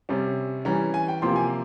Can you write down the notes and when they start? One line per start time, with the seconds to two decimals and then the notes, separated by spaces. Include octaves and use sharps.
0.09 C3 G3 C#4
0.65 E3 G3 C#4 A#5
0.94 G#5
1.08 G5
1.22 C3 F3 A#3 C6
1.36 G#5